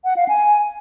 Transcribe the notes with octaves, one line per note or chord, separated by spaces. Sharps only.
F#5
F5
G#5